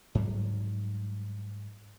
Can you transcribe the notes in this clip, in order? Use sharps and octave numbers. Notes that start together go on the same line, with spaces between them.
G#2 F#3 G3